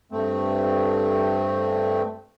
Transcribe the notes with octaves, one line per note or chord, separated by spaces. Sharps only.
G2 A3 C4